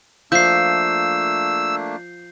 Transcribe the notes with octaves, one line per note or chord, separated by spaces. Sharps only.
F3 A3 A#3 D4 E5 E6 G6 C7